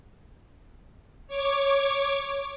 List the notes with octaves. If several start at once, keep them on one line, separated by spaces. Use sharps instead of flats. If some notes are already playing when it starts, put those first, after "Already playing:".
C#5 C#6 D6